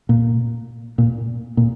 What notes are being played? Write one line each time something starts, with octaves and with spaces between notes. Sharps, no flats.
A#2
A#2
A#2